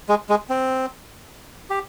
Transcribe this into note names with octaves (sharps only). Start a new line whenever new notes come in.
G#3
G#3
C4
G4